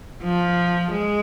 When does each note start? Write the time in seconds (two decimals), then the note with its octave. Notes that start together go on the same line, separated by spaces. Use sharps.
0.24 F3
0.92 G#3